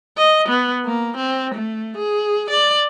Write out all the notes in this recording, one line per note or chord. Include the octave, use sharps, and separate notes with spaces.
D#5
B3
A#3
C4
A3
G#4
D5